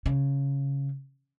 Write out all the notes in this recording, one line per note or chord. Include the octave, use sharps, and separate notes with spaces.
C#3